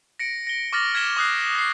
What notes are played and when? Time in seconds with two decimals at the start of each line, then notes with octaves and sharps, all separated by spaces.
0.19 A#6 C#7 D7
0.47 A#6 G7
0.73 C#6 D6 F6 A6 A#6 F#7
0.94 F6 G#6 B6 E7 G7
1.17 C#6 D#6 F#6 C7
1.55 A#6 C7